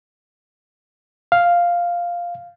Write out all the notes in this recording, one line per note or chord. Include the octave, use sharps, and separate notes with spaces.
F5